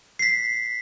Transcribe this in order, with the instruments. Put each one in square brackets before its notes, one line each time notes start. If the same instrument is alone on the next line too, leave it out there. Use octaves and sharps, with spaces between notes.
[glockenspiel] B6 C7